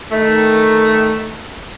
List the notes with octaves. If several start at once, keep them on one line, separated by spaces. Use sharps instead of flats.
D#3 A3